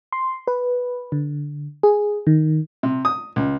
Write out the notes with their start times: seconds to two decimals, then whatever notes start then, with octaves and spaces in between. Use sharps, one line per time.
0.12 C6
0.47 B4
1.12 D3
1.83 G#4
2.27 D#3
2.83 C3
3.05 D#6
3.36 C#2